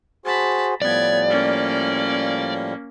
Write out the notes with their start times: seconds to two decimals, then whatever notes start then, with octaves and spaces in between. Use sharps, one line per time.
0.26 F#4 G#4 C5 A5 B5
0.82 A2 F3 G3 B3 D5 G#6
1.29 A#3 C#4